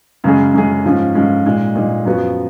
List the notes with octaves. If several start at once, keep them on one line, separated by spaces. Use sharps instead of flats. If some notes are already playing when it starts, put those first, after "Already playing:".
F#2 C#3 G#3 C#4 G#4
F#2 C#3 G#3 C#4 G#4
G#2 F3 G#3 C#4
G#2 F3 G#3 C#4
A#2 G#3 D#4
A#2 G#3 D#4
F#2 F3 B3 F#4